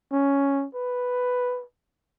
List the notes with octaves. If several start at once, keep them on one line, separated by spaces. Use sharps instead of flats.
C#4
B4